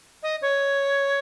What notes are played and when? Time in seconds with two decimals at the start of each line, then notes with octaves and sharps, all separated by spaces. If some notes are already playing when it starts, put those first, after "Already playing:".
0.23 D#5
0.42 C#5